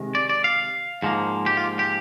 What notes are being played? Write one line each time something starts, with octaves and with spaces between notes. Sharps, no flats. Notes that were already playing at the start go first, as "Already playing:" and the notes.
Already playing: C3 D#3 G#3
D5
D5
F5
G#2 F3 A#3
G4
F4
G4